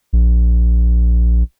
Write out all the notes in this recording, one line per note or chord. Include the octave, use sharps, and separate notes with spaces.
A#1